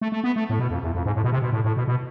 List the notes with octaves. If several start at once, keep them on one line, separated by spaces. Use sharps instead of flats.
A3
A3
B3
A3
A2
B2
F2
E2
F2
G#2
A2
B2
C3
B2
A2
A2
B2
B2